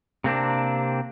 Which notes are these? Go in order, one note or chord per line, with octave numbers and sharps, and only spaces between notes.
C3 A#3 C4 D4